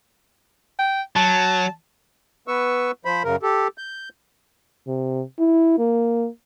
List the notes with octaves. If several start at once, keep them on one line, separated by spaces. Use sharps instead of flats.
G5
F#3 A5
B3 B4 C#6 E6
F3 C5 B5
F#2 C#3 A#4
G4 A4
G6
C3
E4
A#3